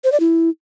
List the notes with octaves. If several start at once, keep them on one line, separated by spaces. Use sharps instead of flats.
C5
D5
E4